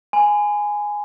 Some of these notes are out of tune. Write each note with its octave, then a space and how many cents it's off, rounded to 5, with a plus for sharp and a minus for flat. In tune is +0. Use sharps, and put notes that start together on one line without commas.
G#5 +0 B5 +40